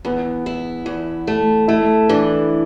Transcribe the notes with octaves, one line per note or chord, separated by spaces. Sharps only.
E2 B3
E4
E2
A3
A3 E4
E3 D4